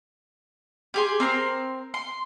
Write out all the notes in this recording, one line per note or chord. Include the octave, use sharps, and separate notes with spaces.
G4 G#4 C6
C4 A#4 C6
C6